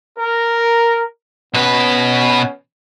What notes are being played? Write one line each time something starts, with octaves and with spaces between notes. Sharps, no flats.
A#4
B2 B3 C#4 B4